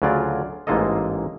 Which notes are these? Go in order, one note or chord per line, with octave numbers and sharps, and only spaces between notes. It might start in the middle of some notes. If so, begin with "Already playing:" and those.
D2 C#3 F#3 F4 D5
A1 G#2 G#3 A#3 A4 D#5